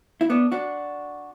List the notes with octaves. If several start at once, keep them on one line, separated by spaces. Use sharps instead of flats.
E4
B3 D4
D4 F#4